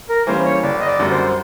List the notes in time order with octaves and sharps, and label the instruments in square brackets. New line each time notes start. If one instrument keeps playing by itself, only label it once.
[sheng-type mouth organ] A#4
[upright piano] E3 G3 A#3 C#4 [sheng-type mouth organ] C5
[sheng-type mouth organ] C#5
[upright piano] F#1 [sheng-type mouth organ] D5
[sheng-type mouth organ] D#5
D5
[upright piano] F#2 D3 G3
[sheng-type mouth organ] C5